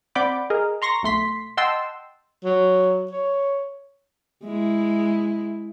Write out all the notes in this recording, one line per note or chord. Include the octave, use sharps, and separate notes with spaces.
C4 D5 F#5 B5 D6 G6
G#4 A#4 D#5
A#5 C6 C#6 A#6
B1 A3 C6 B6
D#5 F#5 G5 A5 C6 E6
F#3
C#5
G#3 E4